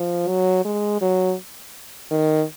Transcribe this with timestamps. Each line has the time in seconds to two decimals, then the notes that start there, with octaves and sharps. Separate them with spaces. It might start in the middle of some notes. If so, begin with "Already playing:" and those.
Already playing: F3
0.28 F#3
0.65 G#3
1.01 F#3
2.11 D#3